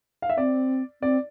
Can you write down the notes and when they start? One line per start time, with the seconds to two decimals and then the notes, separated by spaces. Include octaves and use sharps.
0.22 F5
0.30 E5
0.37 C4 D5
1.02 C4 D5